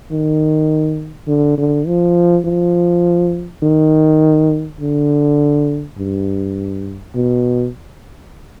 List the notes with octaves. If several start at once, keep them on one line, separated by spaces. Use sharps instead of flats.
D#3
D3
D3
F3
F3
D#3
D3
G2
B2